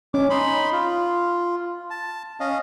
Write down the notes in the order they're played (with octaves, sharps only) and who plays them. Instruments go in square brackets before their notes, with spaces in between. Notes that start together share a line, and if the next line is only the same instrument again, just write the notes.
[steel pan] C#4 [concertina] D6
[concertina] D#4 B5 C6
F4
A5
C#4 D#5 F5